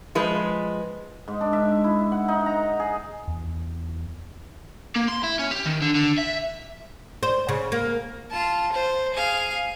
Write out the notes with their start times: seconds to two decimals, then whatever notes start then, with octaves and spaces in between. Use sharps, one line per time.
0.15 F3 G#3 B4
1.28 G#2
1.41 D4
1.53 E5
1.84 E4
2.12 F#5
2.28 D#4
2.46 A#5
2.80 G#4
3.27 E2
4.96 A#3
5.09 C6
5.24 E4
5.39 C#4
5.51 G4
5.65 D#3
5.82 D3
5.95 D3
6.19 E5
7.23 C5
7.49 C#3
7.72 A#3
8.31 F4 A5
8.72 C5
9.14 G#4 F5